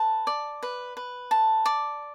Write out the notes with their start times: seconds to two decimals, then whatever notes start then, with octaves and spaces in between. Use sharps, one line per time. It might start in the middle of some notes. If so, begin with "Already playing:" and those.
Already playing: B4 A5
0.27 D5
0.63 B4
0.97 B4
1.31 A5
1.66 D5